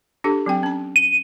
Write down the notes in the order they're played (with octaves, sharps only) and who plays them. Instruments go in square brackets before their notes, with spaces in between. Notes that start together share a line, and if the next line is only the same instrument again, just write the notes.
[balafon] D4 G4 A4
F#3 C4 G5
C#4 A#5
[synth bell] D#7